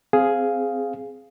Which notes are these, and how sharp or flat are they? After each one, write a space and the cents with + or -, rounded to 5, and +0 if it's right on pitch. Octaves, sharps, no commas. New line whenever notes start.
C4 -5 G#4 +5 F5 +0